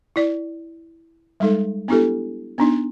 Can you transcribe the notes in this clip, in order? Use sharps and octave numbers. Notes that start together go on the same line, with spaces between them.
E4 D5
G3 G#3 D#4 A4
B3 D4 E4 G4 A4
B3 D4 D#4